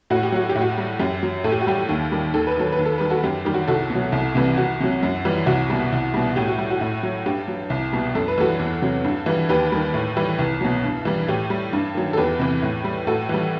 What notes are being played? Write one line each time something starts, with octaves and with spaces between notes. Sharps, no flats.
A2 F#4
G4
F#3 F#4
G4
A2
F#4
G3
F#2 G4
F#3
A2 A4
G4
F#4
G3 G4
D#2
D#3 G3
D#2 A4
B4
D#3 F#3 A4
B4
D#2
A4
D#3 G3 B4
F#4 A4
F#2 G4
D#3 G3 G4
F#4
C2 F#4 A4
B2
F#3
C2
C3 E3 G3
C2 F#4
C3 F#3
F#2
E3 G3
C2 F#4
B2 G3
C2
B2 G3
A2 G4
F#4
G3
F#4
A2
F#3
G2 G4
F#3
C2
B2 G3
F#2 A4
B4
E3 G3 F#4 A4
E2
C3 F#3
G2
E3 G3
D#2 G4 B4
D#3 G3
A2
E3 G3
C2
B2 F#3
G2
E3 G3
A2 G4
G3
G2
D#3 F#3
A4
E2 G4 B4
C3 E3
A2
G3
A2 F#4 A4
E3 G3